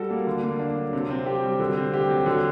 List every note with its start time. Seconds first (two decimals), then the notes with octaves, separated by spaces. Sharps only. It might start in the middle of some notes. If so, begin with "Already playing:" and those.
Already playing: G3 F#4 A4
0.10 A#3
0.27 D3
0.43 A#3
0.59 D4
0.76 F#3
0.93 C3
1.10 C4
1.26 G4
1.43 G3
1.59 D3
1.77 C4
1.94 G4
2.10 F#3
2.26 D3